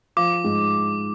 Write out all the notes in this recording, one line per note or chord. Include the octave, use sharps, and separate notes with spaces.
F3 D6
G#2